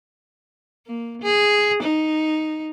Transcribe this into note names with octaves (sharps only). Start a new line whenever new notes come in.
A#3
G#4
D#4